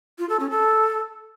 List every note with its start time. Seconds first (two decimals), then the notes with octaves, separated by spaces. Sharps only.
0.19 F4
0.29 A4
0.40 C#4
0.50 A4